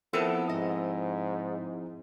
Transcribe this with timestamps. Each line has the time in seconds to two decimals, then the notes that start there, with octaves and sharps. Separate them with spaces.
0.13 F3 B3 C4 E4 A4 A#4 A5
0.49 G#2 D#5